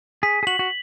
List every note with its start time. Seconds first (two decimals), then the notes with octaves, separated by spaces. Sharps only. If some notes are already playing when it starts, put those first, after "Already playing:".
0.23 G#4 B6
0.43 G#4
0.47 F#4 F#7
0.59 F#4